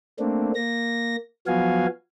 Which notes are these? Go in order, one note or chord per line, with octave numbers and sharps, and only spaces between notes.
A3 A#3 C4 D4
A#3 A#6
F3 F#3 B3 F#4 F5 G#5